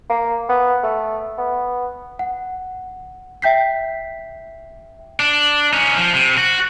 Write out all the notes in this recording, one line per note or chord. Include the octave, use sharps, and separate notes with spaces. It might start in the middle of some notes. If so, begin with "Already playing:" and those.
A#3
B3
A3
B3
F#5
E5 G5 G6 B6 C7
D4
C#4 D#4
F3
C3
F#4